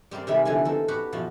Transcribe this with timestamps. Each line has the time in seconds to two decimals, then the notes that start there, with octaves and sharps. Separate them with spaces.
0.11 G3 C4 A#4 D5 C6
0.27 C3 D#3 G3 G#3 E5 B5
0.45 E2 D3 E3 F3 G#4 G#5
0.65 C4 D#4 A4 A#4
0.88 B3 F#4 G4 B4 F#5
1.13 B2 F3 F4 F#4